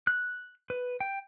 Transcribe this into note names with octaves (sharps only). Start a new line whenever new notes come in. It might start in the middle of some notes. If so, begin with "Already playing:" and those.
F#6
B4
G5